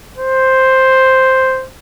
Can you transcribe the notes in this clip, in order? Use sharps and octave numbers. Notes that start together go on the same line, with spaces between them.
C5